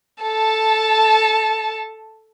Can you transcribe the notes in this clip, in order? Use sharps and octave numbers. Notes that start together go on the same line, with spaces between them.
A4 A5